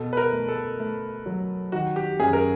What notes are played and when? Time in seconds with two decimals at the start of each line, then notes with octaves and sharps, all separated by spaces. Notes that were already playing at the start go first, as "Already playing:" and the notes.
Already playing: B2 A4
0.13 B4
0.17 A#4
0.33 A3
0.48 A4
0.80 A3
1.26 F#3
1.72 D#3 F#4
1.96 G4
2.20 F#2 G#4
2.33 A#4